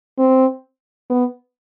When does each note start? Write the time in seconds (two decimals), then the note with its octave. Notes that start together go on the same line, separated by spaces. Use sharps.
0.18 C4
1.10 B3